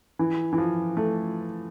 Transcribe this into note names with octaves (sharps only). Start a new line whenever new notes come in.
E3
E3
F3
A3